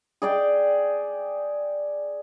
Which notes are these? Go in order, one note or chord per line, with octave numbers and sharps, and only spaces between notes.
G#4 D5 G5